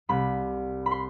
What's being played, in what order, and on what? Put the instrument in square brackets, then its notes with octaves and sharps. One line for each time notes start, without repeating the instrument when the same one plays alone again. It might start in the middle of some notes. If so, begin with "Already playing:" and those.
[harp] C2 C3 G3 B5
B5
C6